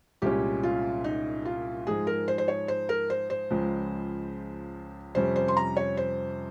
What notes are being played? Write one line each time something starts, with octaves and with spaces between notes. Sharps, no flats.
C2 A#2 G#3 C#4 G4
F4
D#4
F4
G#2 F3 G#3 G#4
A#4
C5
C5
C#5
C5
A#4
C5
C5
C#2 C#3 F3 G#3
F2 C3 G3 C#4 C5
C5
C6
A#5
C#5
C5